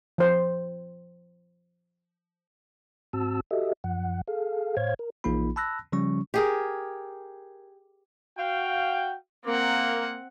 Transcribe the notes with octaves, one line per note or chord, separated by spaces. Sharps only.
F3 C5
G#2 C4 F#4 A5 E6
F#4 G4 A4 D#5 E5
F#2 F3 F#5
G#4 A4 F5
A2 C5 C#5 F5 G#6
A#4
A#1 E3 A#3 D#4 F4 B5
A5 B5 E6 F#6 A#6
C#3 F3 G3 C#4 C#6
G4 G#4 A#4
F#4 F5 G5
A#3 C4 F#5